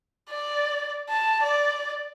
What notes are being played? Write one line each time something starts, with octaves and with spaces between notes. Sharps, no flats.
D5
A5
D5